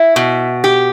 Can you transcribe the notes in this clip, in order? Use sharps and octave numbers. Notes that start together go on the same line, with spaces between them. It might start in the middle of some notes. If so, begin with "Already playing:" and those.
Already playing: E4
B2
G4